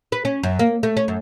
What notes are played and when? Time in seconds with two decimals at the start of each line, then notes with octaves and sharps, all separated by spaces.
0.12 B4
0.25 C#4
0.43 F#2
0.59 A#3
0.83 A3
0.97 C#4
1.08 F#2